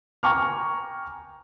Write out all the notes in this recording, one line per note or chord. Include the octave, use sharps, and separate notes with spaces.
G5 G#5 A#5 C#6 D6 F6